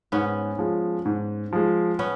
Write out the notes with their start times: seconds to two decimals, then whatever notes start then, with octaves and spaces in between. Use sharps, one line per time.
0.12 G#2 B3 C#4
0.59 F3 G#3
1.05 G#2
1.53 F3 G#3
1.99 B3 C#4